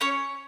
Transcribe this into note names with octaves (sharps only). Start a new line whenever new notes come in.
C#4 C#5